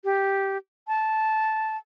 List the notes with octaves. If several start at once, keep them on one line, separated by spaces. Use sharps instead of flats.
G4
A5